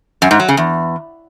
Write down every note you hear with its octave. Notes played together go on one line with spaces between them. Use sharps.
F#2
G#2
F#3
C#3
E2